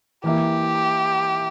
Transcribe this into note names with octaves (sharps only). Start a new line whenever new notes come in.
E3 A#3 E4 G4